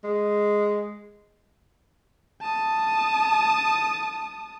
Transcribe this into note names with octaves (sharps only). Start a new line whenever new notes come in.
G#3
A5 D#6